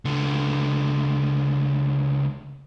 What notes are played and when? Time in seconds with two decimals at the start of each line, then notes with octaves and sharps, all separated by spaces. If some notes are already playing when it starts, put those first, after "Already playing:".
0.05 C#2 D3